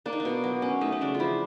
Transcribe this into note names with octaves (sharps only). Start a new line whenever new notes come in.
A#3 D4
D#4
D4
B2
F#3
C#4
A3 D#4
C#4
C#3 D4
F4
F3 E4